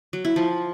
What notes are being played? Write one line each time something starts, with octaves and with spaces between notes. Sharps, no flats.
F#3
E4
F3